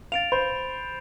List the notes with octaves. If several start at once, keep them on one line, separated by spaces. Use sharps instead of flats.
F5 A6 D7 F7
C5 B5